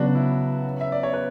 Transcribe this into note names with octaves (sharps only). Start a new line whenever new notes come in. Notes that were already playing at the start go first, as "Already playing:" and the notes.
Already playing: C#3 F#3 B3 D4 F#4
E4
E5
D5
C#5
B4